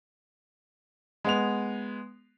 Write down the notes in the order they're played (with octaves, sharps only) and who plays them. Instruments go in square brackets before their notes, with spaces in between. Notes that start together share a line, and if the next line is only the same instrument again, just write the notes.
[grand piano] G#3 B3 F7